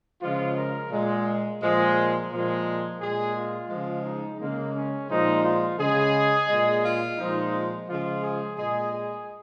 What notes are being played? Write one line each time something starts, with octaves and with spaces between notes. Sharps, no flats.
C#3 F3 G#3 F4
A#4
A#2 G#3
A#2 F3 G#3
A#4
A#2 F3 G#3
A#2 G#3 G#4
F4
C#3 F3 G#3
D#4
C#3 G#3 A#3
C#4
A#2 F3 G#3 D#4
F4
C#3 G#3 G#4
A#2 G#3
F4
A#2 F3 G#3 D#4
C#3 F3 G#3 F4
G#4
A#2 G#3 G#4
G#4